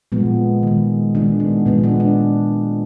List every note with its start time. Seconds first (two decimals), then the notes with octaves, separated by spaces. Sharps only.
0.12 A#2 F3 G#3 B3
0.63 D#3 G#3
1.15 D#3 G#3 D4
1.40 B3
1.66 A#2 F3 G#3 B3
1.84 D4
2.00 D4